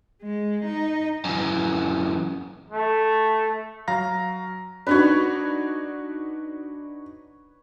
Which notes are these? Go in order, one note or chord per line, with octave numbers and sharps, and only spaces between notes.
G#3
D#4
F#2 E3
A3
F#3 F5 A#5 A#6
D4 D#4 F#4 B4 C#5